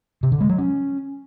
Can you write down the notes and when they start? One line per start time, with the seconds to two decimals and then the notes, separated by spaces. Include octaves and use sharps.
0.23 C3
0.32 D3
0.41 G#3
0.49 F#3
0.58 C#4